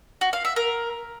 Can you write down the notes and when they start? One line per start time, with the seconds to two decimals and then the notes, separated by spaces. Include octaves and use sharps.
0.21 F#4
0.33 F5
0.45 E5
0.56 A#4